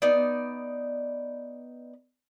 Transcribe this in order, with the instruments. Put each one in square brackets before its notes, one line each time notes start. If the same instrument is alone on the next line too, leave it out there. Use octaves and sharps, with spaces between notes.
[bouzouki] B3 D#4 D5